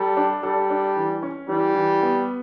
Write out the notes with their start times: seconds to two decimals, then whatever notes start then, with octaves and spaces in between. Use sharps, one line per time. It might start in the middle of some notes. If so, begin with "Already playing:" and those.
Already playing: G3 A4
0.17 D4
0.43 G3 A4
0.70 D4
0.96 E3
1.23 C#4
1.49 E3 G3
1.75 E3
2.02 B3